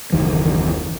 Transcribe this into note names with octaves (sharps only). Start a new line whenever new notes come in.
F#1 D#2 D#3 E3